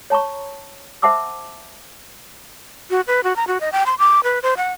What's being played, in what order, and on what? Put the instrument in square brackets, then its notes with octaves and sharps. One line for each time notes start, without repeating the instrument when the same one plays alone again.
[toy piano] C#5 A5 A#5 C#6
C5 E5 F#5 A5 D6 E6
[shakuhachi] F#4
B4
F#4
A#5
F#4
D#5
G5
C6
D6
B4
C5
F#5